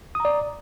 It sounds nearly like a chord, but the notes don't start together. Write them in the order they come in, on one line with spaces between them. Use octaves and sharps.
D#6 A#5 D5